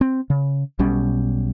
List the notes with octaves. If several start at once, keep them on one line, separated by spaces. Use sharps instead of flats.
C4
C#3
B1 B2 G3 C#4